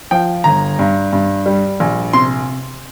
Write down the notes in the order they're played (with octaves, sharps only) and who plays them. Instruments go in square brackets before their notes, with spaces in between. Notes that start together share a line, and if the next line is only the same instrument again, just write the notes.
[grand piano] F3 G5
G1 A#5
G2
G2
G3
A#1
C3 C6